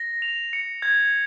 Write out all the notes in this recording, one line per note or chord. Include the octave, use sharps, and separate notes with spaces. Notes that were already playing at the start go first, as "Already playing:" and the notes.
Already playing: A#6
F7
C#7
G#6